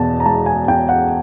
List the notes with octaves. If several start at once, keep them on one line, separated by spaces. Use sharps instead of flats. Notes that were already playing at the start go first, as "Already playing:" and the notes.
Already playing: E2 B2 A5
A#5
G#3 A5
G#5
E2 G5
F#5